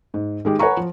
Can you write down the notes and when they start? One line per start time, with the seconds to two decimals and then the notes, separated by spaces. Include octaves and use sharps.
0.14 G#2
0.45 D#3 G#3 G4
0.59 B4 C#5 F#5 G#5 A#5 C#6
0.77 F3